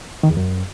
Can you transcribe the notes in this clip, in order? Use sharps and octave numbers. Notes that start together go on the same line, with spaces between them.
D#3
E2
F#2